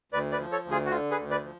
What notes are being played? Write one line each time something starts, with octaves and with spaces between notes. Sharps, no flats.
D2 B4 D5
B4 D5
F3
A4 C#5
D2
F4 G#4
F#4
D3 F4
G#4 B4
D2
B4 D5
F3